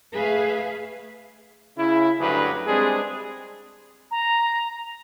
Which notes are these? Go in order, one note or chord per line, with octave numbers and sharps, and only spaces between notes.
A3 G#4 B4 E5 F5
C#3 E4
D2 G2 D3 F#3 G#4 B4
G3 G#3 C4 D4 G#4
A#5